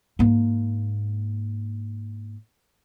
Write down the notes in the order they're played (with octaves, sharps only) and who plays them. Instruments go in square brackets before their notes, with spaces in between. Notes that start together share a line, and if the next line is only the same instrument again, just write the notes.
[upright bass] G#2 A#3